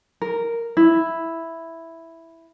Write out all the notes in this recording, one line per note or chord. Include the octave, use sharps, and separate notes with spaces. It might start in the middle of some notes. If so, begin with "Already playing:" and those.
A#4
E4